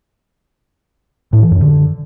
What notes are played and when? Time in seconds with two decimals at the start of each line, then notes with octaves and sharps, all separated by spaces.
1.33 A2
1.42 E3
1.52 F#2
1.61 D3